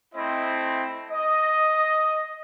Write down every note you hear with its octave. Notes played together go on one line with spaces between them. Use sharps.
A3 C4 E4 C5 D#5
D#5